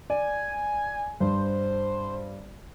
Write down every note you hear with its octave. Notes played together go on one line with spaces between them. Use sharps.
D5 G#5
G2 C5